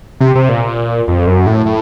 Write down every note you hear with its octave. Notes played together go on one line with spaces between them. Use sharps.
C3
C3
A#2
F2
F#2
A2
A2